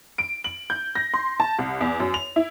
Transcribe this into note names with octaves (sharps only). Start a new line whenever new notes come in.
D7
F#7
G6
A#6
C6
A5
C2
E2
F#2
F7
E4